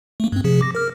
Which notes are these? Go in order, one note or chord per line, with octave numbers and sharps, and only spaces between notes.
A3 A#3
G2 C4
C3 F3 G#4
D6 A#6
A#4 F6